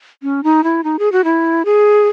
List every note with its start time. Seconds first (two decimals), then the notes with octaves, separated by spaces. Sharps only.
0.23 C#4
0.44 D#4
0.64 E4
0.84 D#4
0.99 G#4
1.12 F#4
1.24 E4
1.65 G#4